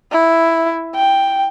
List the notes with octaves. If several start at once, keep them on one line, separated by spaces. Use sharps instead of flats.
E4
G5